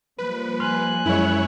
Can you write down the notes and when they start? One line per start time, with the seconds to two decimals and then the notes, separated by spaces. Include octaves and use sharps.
0.18 F3 G3 A#3 B4
0.60 G#5 C6 F6 F#6
1.06 F#2 G#3 E4 C#5